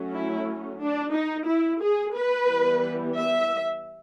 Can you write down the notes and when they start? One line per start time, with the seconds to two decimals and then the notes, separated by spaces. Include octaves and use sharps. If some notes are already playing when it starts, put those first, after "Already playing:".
Already playing: F#3 A3 C#4
0.13 E4
0.81 D4
1.14 D#4
1.48 E4
1.82 G#4
2.15 B4
2.49 E3 G3 B3
3.15 E5